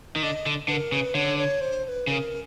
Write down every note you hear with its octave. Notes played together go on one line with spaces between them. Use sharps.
D#3
D3 D#5
D3
D3 B4
A#4
C#3 B4
D3 C#5
C#5
C5
C5
B4
C#3 A#4 B4